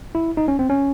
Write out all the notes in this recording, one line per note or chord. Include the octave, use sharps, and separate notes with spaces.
E4
D#4
C#4
C4
C#4